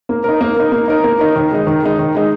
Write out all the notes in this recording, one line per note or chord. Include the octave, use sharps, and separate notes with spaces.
A#3
D#4 A#4
A#3
D#4 A#4
A#3
D#4 A#4
A#3
D#4 A#4
D#3
G#3 D#4
D#3
G#3 D#4
D#3
G#3 D#4